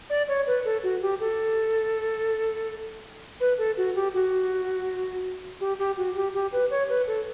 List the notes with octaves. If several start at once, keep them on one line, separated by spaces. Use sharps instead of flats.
D5
C#5
B4
A4
F#4
G4
A4
B4
A4
F#4
G4
F#4
G4
G4
F#4
G4
G4
B4
C#5
B4
A4